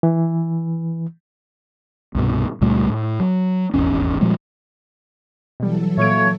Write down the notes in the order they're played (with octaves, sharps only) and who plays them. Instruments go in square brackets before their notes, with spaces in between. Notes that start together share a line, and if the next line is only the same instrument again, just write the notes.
[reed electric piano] E3
[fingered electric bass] C2 G2 B2
C#2 A#2 G3 A3
A2
F#3
D#1 G#1 E2 C#4
A#2 F3 G3 G#3
[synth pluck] B2 G3 [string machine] E3 F#3 A4
[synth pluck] A#2 D7 [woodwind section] A3 A#3 C#5